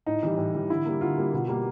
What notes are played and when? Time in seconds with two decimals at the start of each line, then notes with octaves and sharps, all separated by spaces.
0.07 A2 D#4
0.23 E3 G3
0.38 A2
0.55 E3 G3
0.70 D3 E4
0.86 G3 A#3
1.01 D3 F4
1.18 G3 A#3
1.33 B2
1.48 G3 A#3